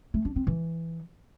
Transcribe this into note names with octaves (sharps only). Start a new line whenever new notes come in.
A3
D4
C4
E3